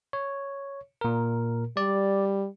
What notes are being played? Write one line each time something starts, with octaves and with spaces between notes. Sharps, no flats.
C#5
A#2 A#4
G3 D5